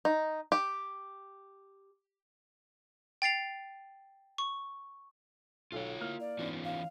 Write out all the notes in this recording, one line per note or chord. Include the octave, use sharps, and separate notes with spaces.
D#4
G4
G5 A6 C7 F7
C#6
B1 F4 A4 C#5 F5
A#3 E4 F6
D5
G#2 E3 B3 C#4 F4
F5